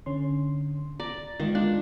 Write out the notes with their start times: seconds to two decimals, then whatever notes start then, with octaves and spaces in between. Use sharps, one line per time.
0.06 D3 C#4 C6
1.00 D5 A#5 A6
1.40 D#3 G#3 F4 D5 D#5
1.55 D4 F4